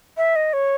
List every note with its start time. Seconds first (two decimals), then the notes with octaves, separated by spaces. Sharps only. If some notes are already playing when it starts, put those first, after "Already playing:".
0.17 E5
0.36 D#5
0.53 C#5